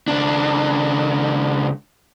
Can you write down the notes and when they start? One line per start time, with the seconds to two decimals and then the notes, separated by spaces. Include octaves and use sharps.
0.08 C#2 D4